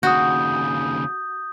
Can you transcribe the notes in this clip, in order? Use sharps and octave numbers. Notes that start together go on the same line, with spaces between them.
D#2 C#3 F#4 D#6 G6